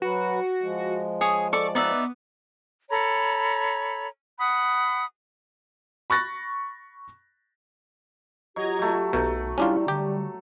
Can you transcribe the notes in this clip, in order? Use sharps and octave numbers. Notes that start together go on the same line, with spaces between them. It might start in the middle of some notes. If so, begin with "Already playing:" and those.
F#3 F#4 B4
F3 G#3
G#4 C#5 D#6
A4 D5 C#6
B3 D#4 D5 E5
A4 C#5 A#5 B5
F#5 B5 D#6
B5 C#6 F#6 A6 A#6
F#3 G4 D#5 A#5 G#6
F#3 A3
B1 B2 A3
G3 C#4 D4 E4 F4
D3 G4